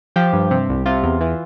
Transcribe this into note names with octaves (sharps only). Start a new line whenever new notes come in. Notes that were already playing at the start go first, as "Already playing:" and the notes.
F3 G4
G2
C3
C2
C3 F4
E2
E3